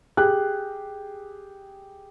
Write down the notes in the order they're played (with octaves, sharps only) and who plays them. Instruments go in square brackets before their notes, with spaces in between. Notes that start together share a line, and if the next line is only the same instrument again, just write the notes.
[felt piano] G4 G#4 F#6